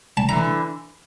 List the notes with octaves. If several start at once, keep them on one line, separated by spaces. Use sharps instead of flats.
A5
D3 E3 A#5